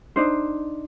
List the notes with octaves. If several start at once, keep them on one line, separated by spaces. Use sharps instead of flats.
D4 D#4 C5